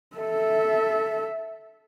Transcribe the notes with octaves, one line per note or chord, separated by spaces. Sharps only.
A4 E5